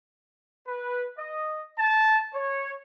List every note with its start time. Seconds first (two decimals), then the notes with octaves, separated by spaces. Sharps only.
0.68 B4
1.18 D#5
1.79 A5
2.35 C#5